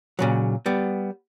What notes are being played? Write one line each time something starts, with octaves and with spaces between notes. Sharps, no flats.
A#2 C#3 F#3
G3 B3